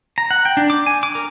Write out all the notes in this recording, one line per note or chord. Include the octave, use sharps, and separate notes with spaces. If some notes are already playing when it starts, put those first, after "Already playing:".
A#5
F#5
G5
D4
D6
G#5
D6
A#4